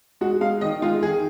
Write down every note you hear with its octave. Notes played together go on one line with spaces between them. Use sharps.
G#3 F#4
G#3 F5
D#3 D#5
G#3 F4
D#3 G#4